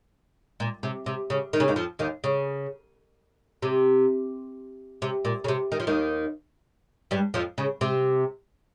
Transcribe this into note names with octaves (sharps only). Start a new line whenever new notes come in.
A#2
C3
C3
C#3
D#3
C#3
D#2 D#3
F2 F3
D#2 D#3
C#3
C3
C3
A#2
C#3
C3
D#3
F3
D#2 D#3
G2 G3
F2 F3
C#3
C3 C4